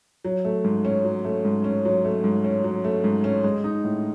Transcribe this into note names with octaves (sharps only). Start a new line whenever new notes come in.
F#3
A3
G#2
C#4
F#3
A3
G#2
C#4
F#3
A3
G#2
C#4
F#3
A3
G#2
C#4
G#3
D#4
A2